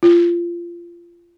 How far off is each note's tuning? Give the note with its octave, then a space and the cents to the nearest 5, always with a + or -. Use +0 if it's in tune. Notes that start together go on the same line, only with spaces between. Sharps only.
F4 -20